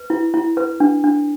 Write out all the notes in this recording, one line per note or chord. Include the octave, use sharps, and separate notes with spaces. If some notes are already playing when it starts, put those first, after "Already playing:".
Already playing: B4
E4
E4
B4
D4
D4